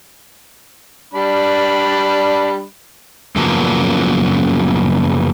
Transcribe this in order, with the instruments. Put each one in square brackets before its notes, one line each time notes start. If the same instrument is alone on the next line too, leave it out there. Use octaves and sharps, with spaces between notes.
[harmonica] G3 D4 B5
[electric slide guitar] F#2 C#3 F3 F#3 A#3 B3